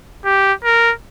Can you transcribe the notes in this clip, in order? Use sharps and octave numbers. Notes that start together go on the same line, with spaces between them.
G4
A#4